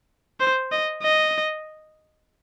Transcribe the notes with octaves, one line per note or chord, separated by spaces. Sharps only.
C5
D#5
D#5